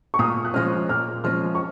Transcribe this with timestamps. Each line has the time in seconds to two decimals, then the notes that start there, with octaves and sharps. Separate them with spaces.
0.14 C#6
0.19 A#2 D#6
0.45 F#6
0.54 F3 G#3 C#4 F6
0.89 A#2 F6
1.24 F3 G#3 C#4 F6
1.55 C#6